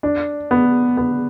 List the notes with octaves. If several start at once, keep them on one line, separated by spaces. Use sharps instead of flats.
D4
B3
B3